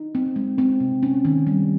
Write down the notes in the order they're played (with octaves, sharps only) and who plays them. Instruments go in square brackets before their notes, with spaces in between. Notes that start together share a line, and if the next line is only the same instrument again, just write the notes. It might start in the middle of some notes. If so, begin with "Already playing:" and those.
Already playing: [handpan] D#4
C4
G#3
C4
C3
C#4
D#3
G3